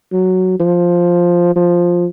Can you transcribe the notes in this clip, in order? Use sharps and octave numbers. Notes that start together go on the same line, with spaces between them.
F#3
F3
F3